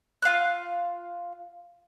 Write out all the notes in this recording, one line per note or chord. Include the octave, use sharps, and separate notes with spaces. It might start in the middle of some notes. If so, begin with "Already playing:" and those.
F4 F5 E6 F#6